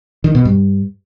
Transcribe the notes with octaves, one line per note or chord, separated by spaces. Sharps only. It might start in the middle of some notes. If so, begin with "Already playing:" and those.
D#3
B2
G2